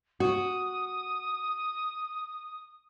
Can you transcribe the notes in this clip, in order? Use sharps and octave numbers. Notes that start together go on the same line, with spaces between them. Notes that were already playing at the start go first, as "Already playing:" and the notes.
F#4 D#6